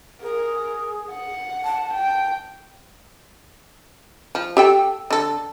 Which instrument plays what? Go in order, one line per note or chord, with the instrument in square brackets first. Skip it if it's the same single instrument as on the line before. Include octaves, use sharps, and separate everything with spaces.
[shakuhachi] G#4 [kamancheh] A#4
[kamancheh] F#5
[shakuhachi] A5
[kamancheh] G5
[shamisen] F3
G4 A4 G5
D3 A4